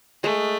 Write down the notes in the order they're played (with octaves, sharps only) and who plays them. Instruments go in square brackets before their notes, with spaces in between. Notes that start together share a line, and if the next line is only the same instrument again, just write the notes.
[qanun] G#3 [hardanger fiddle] A3